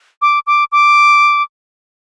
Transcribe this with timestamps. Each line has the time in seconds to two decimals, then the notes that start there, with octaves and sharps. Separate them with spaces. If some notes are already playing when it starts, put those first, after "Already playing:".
0.22 D6
0.47 D6
0.72 D6